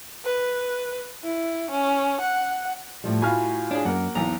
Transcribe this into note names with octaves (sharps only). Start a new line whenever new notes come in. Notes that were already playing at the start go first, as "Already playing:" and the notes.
B4
E4
C#4
F#5
A2 F3 G3
A2 F4 F#4 G#5 B5 F6
D4 G#4 C#5
F#2 A#3 A#4 F#5
B1 E2 E3 B3 A#5